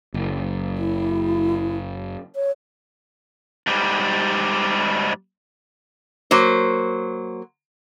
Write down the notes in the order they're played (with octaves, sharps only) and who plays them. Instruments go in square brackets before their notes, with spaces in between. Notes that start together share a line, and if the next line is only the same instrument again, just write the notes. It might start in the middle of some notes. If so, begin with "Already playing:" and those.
[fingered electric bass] F#1
[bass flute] E4
C#5
[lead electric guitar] G#2 G3
[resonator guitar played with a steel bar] F#3 A#3 C5